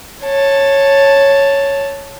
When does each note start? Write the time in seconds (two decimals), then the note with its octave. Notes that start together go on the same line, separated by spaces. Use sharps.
0.24 C#5 A5